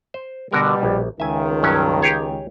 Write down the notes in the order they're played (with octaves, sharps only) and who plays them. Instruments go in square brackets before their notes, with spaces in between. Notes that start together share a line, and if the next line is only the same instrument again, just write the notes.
[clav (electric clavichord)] C5
[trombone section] B2 G3 [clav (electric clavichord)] D3 F#4 A#4
[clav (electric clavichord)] A#1
[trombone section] C#2 D#3 [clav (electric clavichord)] E5 G#5
[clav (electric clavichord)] G2 F#3 C#4
G4 G#4 C#5